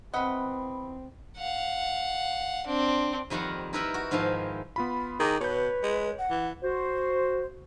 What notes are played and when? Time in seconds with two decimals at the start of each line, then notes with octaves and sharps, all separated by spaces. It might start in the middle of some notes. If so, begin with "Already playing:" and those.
0.14 E2 C4 B4 D#5 F#5 B5
1.38 F5 F#5
2.67 C4 D4
3.30 F2 D#3 G3 F5 F#5 A#5
3.73 D#4 E4 A#4 B4 E5 B5
3.94 F#4
4.11 G#2 D#3 F3 E4 F5
4.76 B3 F4 B5
5.20 D#3 G#4 A#5 D6 D#6
5.41 B2 B4 C#5 G6
5.83 G#3
6.18 F#5
6.30 E3
6.62 F#4 C5